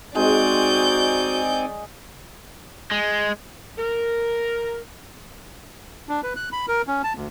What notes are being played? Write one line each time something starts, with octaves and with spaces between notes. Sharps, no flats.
G#3 C4 D#4 F#4 D5 G#5 G6
G#3
A#4
D4
B4
F#6
B5
A#4
C#4
A5
D2